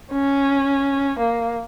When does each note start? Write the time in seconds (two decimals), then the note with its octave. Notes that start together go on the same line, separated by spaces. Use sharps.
0.12 C#4
1.19 A#3